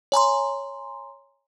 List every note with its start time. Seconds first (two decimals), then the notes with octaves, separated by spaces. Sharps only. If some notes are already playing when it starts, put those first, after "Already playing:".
0.12 C#5 G#5 A#5 C6